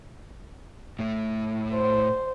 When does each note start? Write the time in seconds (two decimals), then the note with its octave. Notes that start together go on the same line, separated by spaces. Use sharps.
0.99 A2 A3
1.74 C5